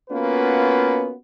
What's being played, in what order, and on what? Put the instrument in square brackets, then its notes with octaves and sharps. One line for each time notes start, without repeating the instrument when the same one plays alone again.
[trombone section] A#3 B3 C#4 F4 F#4 B4